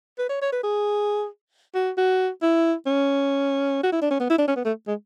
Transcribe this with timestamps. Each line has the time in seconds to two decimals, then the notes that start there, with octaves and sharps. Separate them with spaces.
0.19 B4
0.30 C#5
0.42 C#5
0.52 B4
0.64 G#4
1.75 F#4
1.98 F#4
2.42 E4
2.86 C#4
3.83 F#4
3.92 E4
4.02 D4
4.11 C#4
4.20 B3
4.30 E4
4.38 D4
4.48 C#4
4.56 B3
4.65 A3
4.87 G#3